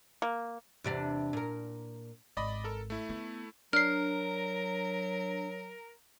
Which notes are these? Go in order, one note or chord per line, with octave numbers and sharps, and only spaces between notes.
A#3
E2 C3 D4
A#2 A#4
G#1 D5 D#5 B5
A4 A#4
A3 E4
B3
F#3 D4 A#4 F6 C7